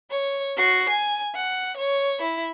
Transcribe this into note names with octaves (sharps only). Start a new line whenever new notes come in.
C#5
F#4 C7
G#5
F#5
C#5
E4